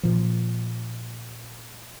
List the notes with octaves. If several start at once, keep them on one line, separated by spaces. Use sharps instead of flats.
A#2 F3